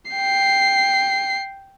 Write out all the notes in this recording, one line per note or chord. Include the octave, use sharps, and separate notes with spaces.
G5 C7